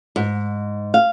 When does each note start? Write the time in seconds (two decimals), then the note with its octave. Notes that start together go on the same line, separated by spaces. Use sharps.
0.16 G#2
0.94 F5